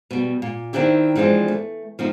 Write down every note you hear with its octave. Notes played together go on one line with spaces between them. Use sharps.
B2 G3
A#2
D#3 C4 D4 E4 G4
E3 F3 G#3 C4 D4
A3
F3 C4 D#4